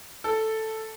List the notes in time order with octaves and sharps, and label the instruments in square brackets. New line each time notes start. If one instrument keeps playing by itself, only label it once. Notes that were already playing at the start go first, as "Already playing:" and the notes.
[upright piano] A4